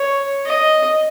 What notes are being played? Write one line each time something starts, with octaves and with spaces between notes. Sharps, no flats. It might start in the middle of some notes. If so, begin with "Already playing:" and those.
Already playing: C#5
D#5